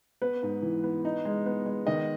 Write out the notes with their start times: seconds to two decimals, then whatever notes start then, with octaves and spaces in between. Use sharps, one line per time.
0.22 B3 B4
0.43 G#2
0.62 E3
0.84 B3
1.05 D#4
1.25 G#3
1.46 B3
1.66 G#3
1.87 D#3 D#5